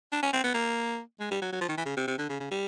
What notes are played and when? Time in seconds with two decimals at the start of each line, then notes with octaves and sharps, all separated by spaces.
0.12 D4
0.23 C#4
0.33 C4
0.44 B3
0.54 A#3
1.20 G#3
1.31 G3
1.42 F#3
1.52 F#3
1.61 F3
1.69 D#3
1.77 E3
1.86 C#3
1.97 C3
2.07 C3
2.18 D3
2.29 C#3
2.40 C#3
2.51 G3